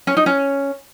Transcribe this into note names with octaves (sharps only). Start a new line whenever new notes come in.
C#4
D#4
C#4